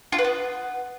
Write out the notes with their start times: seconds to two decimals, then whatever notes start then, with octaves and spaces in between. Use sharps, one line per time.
0.12 F4
0.18 B4
0.24 B3